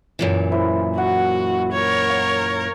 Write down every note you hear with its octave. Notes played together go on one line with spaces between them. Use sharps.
F#2 A#2 E3
E4 C5
F#4 F#5
A#4 C#5
F5